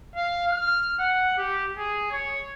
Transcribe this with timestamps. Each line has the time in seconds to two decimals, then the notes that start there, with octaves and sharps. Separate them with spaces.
0.16 F5
0.51 F6
0.99 F#5
1.37 G4
1.77 G#4
2.12 C#5